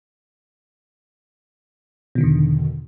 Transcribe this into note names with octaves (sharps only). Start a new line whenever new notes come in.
E2 B2 D3 D#3